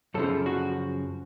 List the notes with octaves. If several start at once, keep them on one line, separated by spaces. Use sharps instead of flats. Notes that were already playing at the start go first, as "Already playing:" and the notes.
F#2 C#3 F3 A4
F#4